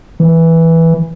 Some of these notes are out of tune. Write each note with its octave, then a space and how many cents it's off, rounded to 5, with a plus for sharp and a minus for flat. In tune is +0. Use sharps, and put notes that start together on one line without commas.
E3 -5